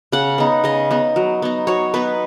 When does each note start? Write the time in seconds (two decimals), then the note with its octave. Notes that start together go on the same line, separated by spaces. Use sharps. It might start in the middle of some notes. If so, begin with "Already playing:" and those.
0.12 C#3 F#5
0.38 B3 D#4
0.64 C#3 D#5
0.91 B3 D#4
1.16 F#3
1.42 B3 D#4
1.67 F#3 C#5
1.94 B3 D#4 B4